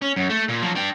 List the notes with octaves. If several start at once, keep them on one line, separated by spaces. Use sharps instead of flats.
C#4
F#2
A3
A#2
F3 F#3
D4 G5